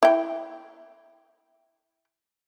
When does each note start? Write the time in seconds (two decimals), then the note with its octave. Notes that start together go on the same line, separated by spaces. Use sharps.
0.03 E4 G5